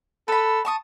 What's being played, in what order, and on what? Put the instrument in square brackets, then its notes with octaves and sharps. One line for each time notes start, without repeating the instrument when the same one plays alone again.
[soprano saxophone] A4 [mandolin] B4 B5
[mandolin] A5 C#6 D#6